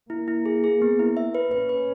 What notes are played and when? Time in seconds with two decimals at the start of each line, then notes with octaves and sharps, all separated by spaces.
0.10 A#3 E4
0.28 E4
0.46 G#4
0.64 G#4
0.82 B3
0.99 E4
1.17 E5
1.35 B4
1.51 C#4 B4
1.69 B4